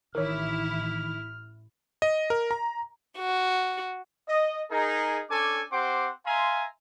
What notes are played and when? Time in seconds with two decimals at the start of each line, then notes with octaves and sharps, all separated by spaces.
0.15 A1 D#3 E3 E4 A#4 C#5 F6
2.02 D#5
2.30 A#4
2.51 A#5
3.18 F#4
4.29 D#5
4.71 D#4 G#4 A#4
5.30 C#4 D4 A4 G#5 D6
5.72 C4 G4 C5 F#5 C6 D6
6.26 E5 F5 G#5 A#5 C6